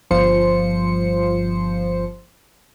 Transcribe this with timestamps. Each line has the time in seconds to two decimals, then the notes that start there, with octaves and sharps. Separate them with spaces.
0.11 G1 F3 C5 C#7